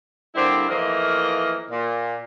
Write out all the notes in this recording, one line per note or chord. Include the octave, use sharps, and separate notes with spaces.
D3 G3 A#3 C4 E4 G4
E3 F3 A3 A#3 A#4 D#5
A#2